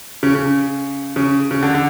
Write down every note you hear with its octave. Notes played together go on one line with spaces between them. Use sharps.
C#3
C#3
C#3
C#3
D3
D3